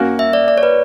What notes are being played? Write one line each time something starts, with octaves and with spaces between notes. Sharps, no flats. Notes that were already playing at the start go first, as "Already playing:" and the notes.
Already playing: A#3 C#4 F#4
E5
D5
D5
C#5
B4